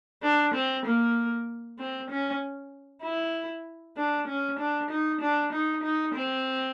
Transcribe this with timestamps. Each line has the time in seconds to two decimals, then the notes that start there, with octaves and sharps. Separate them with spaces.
0.23 D4
0.54 C4
0.86 A#3
1.79 C4
2.10 C#4
3.03 E4
3.97 D4
4.27 C#4
4.59 D4
4.90 D#4
5.21 D4
5.52 D#4
5.83 D#4
6.14 C4